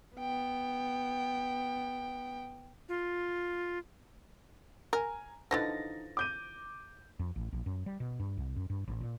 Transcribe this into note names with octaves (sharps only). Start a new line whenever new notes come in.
B3 G5
F4
A#4 G#5 A#5
D3 E3 F3 D#4 A6 A#6
D6 G6 D#7
F2
A1
A#1
F#2
G3
B2
G2
C2
F#2
G2
A1
A#2